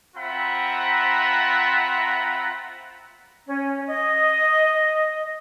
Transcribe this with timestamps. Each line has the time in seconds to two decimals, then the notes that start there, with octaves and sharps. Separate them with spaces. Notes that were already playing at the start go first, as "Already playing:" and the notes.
0.15 C4 F4 E5 F#5 A#5 B5
3.48 C#4
3.87 D#5